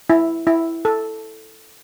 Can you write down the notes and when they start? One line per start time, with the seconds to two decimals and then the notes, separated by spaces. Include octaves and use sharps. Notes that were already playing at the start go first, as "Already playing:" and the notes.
0.10 E4
0.47 E4
0.85 A4